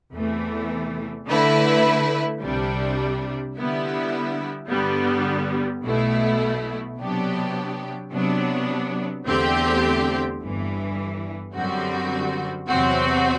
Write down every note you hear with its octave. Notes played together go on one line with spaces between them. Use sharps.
E2 C3 E3 A3
D3 A3 E4 B4
C2 C3 G3 D4
D3 G3 B3 E4
G2 D3 G3 B3
B1 B2 A3 E4
C3 F#3 B3 D4 G4
C3 F#3 B3 D4
E2 D3 A3 C4 G4
G1 G2 E3
F#2 D3 G3 C4 F#4
E2 C3 F#3 C4 F#4